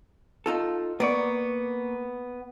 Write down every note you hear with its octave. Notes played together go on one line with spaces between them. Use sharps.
D#4 F4 A4
A#3 B3 D5 C#6